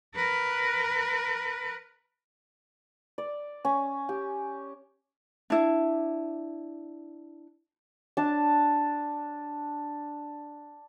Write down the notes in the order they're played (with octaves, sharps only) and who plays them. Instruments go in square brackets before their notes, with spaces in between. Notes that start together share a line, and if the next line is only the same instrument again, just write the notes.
[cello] A#4 B4
[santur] D5
C#4
G4
[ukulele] D4 E4
[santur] D4 A5